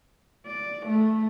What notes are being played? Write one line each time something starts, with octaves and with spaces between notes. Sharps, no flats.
D5
A3